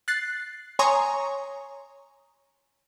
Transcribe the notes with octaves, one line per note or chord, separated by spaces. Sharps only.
F#6 A6 C7
C#5 G#5 A#5 C6 C#6 D#6